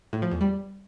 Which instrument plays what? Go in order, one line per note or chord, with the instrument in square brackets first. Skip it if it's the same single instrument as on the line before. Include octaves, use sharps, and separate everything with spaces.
[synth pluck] A2
F3
E2
G3